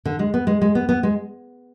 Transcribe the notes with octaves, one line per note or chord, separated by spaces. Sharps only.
D3
G#3
B3
G#3
G#3
B3
B3
G#3